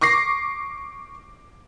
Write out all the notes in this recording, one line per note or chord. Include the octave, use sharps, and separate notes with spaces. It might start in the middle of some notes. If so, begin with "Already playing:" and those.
C#6 D6 A#6 C7